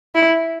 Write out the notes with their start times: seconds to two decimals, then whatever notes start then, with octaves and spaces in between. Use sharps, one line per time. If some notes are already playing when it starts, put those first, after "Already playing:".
0.15 E4